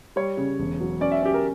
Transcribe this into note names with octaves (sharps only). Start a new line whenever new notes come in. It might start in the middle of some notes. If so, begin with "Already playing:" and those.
G3 C#5
C#3
E1
F#3
C#4 D5
E5
C#4 G4
A#4